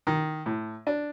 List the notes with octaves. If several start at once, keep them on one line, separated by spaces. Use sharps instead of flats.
D#3
A2
D4